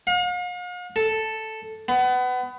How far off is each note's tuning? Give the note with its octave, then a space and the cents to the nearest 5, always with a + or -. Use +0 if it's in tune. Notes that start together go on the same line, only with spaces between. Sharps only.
F5 +45
A4 +0
B3 +25